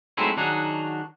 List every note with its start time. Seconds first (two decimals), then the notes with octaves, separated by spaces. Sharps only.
0.17 F#3 G#3 A3 C4 D#4 E4
0.37 D#3 F#3 D4 D#4 F#4 G#4